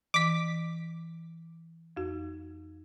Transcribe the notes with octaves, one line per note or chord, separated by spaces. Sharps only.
E3 D6 B6
F2 F#4